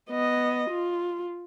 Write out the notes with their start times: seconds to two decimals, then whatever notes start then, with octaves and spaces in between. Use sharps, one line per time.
0.10 B3 D#5
0.70 F4